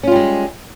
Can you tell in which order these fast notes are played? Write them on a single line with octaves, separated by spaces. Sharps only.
C#4 F4 G3 G#3